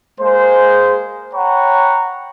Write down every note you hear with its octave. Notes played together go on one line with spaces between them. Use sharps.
G#3 A#3 G#4 C5
C#5 F#5 G5 A#5 B5 C#6